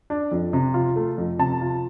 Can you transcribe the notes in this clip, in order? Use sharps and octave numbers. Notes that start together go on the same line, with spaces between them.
D4
F2
C3
F4
A3
F2
C3 A5
F4